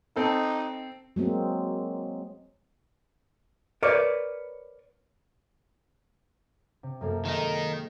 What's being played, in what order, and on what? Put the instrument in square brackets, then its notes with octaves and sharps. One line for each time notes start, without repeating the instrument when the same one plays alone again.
[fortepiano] C4 A4 [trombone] D#4
[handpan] F#3 G#3 A#3 C4
[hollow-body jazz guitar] A#4 B4 C#5 D5
[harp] C3
F#2 A#3 A4
[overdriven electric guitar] D#3 D#4 [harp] G#3